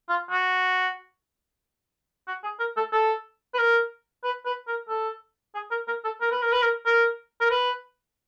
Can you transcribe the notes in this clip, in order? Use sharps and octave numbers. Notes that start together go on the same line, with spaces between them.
F4
F#4
F#4
G#4
A#4
A4
A4
B4
A#4
B4
B4
A#4
A4
G#4
A#4
A#4
A4
A#4
B4
A#4
B4
A#4
A#4
A#4
B4